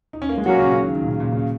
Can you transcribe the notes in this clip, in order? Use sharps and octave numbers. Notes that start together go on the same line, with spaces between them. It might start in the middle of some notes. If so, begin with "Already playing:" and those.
D#4
C#4
A#3
G#3
A#2 F#3 A#3 C#4 F#4
C#3
C#3
D#3
D#3
A#2
C#3
A#2
C#3